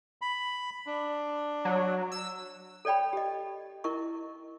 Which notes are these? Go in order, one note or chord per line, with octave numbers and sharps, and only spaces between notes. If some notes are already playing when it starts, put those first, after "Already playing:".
B5
D4
F#3
E6
A4 C#5 D5 G5 B5
G4 D#5
E4 A#4 D#5 C#6